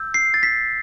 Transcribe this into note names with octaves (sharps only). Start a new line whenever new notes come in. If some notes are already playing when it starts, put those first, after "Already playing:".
Already playing: E6 G6
C7
A6
B6